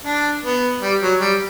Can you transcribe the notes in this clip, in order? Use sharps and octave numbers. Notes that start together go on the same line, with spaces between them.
D4
B3
G3
F#3
G3